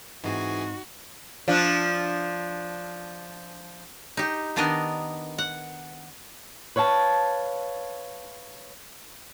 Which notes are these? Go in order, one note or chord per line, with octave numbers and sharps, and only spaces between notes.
G#2 E3 C4 D#4 F#4 G#4 G#5
F3 D4
D#4 G4
D#3 B3 D4 A#4 D#5
F#5
B4 C#5 F5 A5